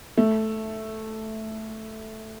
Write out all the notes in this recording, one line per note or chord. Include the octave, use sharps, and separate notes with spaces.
A3